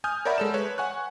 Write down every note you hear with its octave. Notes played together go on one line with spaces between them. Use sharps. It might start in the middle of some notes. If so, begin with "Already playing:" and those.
G#5 D#6 F6 G6
A#4 C#5 D5 E5 F#5 B5
G#3 A4 E7
B4 C#5
F#5 G#5 C#6 F#6